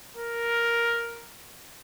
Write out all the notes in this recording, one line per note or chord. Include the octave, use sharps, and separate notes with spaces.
A#4